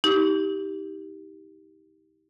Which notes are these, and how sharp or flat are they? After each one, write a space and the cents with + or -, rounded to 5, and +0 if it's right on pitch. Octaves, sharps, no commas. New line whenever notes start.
D#4 +35 G4 +0 D6 -45